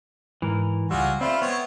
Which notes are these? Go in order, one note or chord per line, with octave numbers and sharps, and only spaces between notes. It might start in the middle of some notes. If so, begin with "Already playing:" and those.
G#2 E3 A#4
C#2 G3 F4 F#4 G#4 E6
A3 C4 F4 D5 E5 B5
B3 C4 C#5